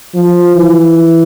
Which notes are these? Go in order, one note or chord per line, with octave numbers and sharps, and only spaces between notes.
F3
E3